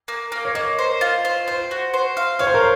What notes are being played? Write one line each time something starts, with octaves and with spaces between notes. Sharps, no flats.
A#3
A#3
C#5
A#3 D#5
C5
F4
C5
C5
F#4
C5
F5
C#5 F5
C5
A#4